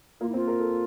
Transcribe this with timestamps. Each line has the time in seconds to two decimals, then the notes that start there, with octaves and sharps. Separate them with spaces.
0.21 A#3 F4
0.29 E4
0.33 C4 F4
0.47 A#4
0.60 A4